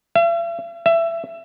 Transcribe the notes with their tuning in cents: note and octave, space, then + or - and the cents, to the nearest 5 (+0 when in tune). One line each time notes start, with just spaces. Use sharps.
E5 +45
E5 +20